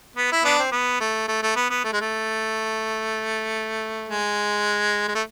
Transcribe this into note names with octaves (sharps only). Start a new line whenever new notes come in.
B3
E4
B3 D4
C4
B3
A3
A3
A3
B3
B3
A3
G#3
A3
G#3
G#3
A3